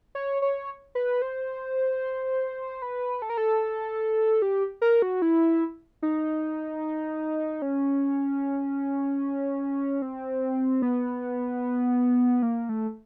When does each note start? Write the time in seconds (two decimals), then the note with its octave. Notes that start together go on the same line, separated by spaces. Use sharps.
0.15 C#5
0.42 C#5
0.95 B4
1.22 C5
2.82 B4
3.22 A4
3.30 A#4
3.37 A4
4.42 G4
4.82 A#4
5.02 F#4
5.22 E4
6.02 D#4
7.62 C#4
10.02 C4
10.82 B3
12.42 A#3
12.69 A3